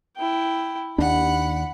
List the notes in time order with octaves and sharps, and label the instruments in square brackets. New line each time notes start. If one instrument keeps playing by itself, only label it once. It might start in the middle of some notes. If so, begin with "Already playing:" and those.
[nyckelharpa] E4 G5
[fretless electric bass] D#2 D4 [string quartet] F#5 [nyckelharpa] B5